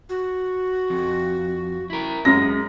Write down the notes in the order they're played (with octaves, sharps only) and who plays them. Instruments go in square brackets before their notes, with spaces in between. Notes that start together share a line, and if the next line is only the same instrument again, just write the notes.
[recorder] F#4
[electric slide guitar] F2
E4 A#4
[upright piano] F#2 A#6 [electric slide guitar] G#3